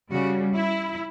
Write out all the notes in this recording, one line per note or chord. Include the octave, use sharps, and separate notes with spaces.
C#3 G3 F#4
E4